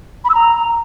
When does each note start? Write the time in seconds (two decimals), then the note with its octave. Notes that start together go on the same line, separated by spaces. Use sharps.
0.25 B5
0.30 E6
0.35 A#5